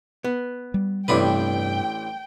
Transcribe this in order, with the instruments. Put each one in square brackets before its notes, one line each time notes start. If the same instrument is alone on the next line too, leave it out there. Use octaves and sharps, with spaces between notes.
[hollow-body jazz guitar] B3
[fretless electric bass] G3
[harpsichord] A1 D4 B4 [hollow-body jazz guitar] G2 C3 [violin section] G5